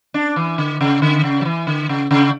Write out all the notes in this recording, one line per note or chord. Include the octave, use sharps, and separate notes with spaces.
D4
E3
D3
C#3
D3
C#3
F#3
E3
D3
C#3
C#3